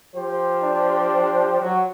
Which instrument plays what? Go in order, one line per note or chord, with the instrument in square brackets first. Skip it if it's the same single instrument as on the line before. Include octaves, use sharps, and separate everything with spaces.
[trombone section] F3 G4 C5
[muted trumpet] D4
[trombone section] F#3 F#4